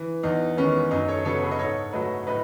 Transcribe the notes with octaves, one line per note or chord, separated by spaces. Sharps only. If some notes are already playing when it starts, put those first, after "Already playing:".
Already playing: E3
E2 D#4
D#3 G#3 B3 C#4
F#2 D#4
A4 C#5
C#3 F#3 B3 A4 C#5
G#4 B4
D#5
G#2 A4 C#5
F#3 A3 B4 D#5
A2 B4 D#5